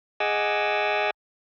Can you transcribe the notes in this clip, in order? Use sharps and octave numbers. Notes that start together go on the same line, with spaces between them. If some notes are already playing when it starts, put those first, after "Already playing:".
G#4 D#5 F#5 G#5 D6 E6